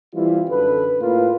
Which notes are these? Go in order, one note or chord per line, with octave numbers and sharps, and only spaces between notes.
E3 G3 C4 E4 F4
F#2 D3 A4 B4
A2 A#3 F4 B4